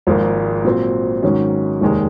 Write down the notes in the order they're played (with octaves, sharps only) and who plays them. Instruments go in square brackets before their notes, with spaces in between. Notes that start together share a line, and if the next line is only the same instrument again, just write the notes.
[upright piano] G#1 G#2 F3 A#3
A#2 F#3 C4
G#2 D#3 F#3 C#4
F1 D#2 D#3 G#3